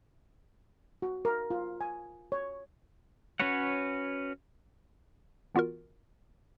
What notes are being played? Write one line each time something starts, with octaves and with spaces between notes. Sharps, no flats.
F#4
A#4
F4
G#5
C#5
C#4 F#4 B4 C#5 F#5
E3 B3 F4 F#4 A#4